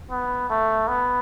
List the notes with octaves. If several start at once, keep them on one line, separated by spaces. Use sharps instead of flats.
B3
A3
B3